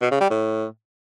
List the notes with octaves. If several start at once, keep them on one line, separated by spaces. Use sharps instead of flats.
B2
C#3
G3
A2